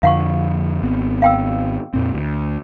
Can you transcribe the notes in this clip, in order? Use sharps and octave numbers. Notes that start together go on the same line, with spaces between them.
F2 D3 F3 F5 F#5 C#6
G#1 B3 C4
F5 G5 E6
F2 A#2 C4
D2